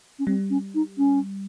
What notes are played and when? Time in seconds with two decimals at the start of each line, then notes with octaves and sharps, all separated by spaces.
0.19 C#4
0.27 G3 C4
0.50 C#4
0.75 D#4
0.98 C#4